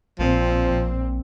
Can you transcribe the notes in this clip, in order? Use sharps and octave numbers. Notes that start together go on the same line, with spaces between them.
A#1 A#2 F3 C4
A#1